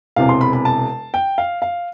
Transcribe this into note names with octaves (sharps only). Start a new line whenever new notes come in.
E1 E2 C3 F5
C6
B5
B5
A5
G5
F5
F5